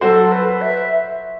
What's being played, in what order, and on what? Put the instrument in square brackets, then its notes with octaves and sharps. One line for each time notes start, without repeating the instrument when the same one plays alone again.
[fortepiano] F#3 C4 F#4 C5 [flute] A4
[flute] B4
E5